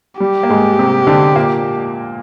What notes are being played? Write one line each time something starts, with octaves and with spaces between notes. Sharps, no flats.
G3 G4
A#3
G#2 G#3
C3 C4
D3 D4
A#2 A#3